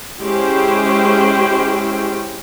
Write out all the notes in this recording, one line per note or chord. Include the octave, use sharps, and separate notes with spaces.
G#3 C#4 E4 G4 C5